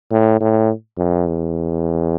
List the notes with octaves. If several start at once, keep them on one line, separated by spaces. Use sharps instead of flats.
A2
A2
F2
E2